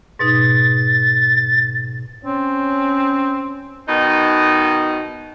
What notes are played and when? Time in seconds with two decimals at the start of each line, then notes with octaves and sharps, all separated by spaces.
0.19 G#2 B2 D#4 A6
2.25 C4 C#4
3.89 B2 D#3 D#4